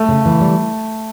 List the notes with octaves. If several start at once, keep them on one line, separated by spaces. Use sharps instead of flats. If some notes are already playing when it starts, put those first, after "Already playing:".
Already playing: A3
C#3
E3
G3